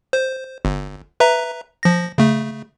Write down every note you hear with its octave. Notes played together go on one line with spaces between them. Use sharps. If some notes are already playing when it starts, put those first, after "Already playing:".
C5
G1
B4 E5 A#5
F3 A#6
C#3 A3